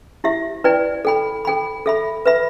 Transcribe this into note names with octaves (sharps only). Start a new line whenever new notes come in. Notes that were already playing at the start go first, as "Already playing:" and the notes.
E4 G4 E5
E4 B4 D5 G5
A4 G5 B5
A4 G5 B5
A4 E5 B5
B4 E5 B5